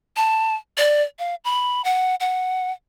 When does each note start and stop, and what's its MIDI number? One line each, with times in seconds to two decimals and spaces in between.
0.16 0.55 81
0.77 1.03 74
1.19 1.35 77
1.44 1.82 83
1.84 2.15 78
2.20 2.71 78